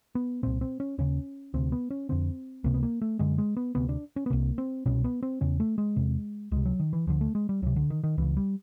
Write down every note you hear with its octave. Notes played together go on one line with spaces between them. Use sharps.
B3
C2 A#2 C4
C4
C#4
D#2 C#3 C#4
D2 C3 C4
B3
C#4
F2 D3 C4
C#2 C3 A#3
B3
A#3
A3
F#2 D3 G#3
G#3
B3
D2 C3 B3
D4
C#4
B3
C2 C3 A#3
C4
C2 B2 C#4
B3
C4
E2 C#3 C#4
A3
G#3
E2 C3
C#2 C3 G#3
F#3
D#3
E3
D2 D3 F3
A3
G#3
G3
C#2 C3 F#3
D3
D#3
D#3
C#2 C#3 E3
G3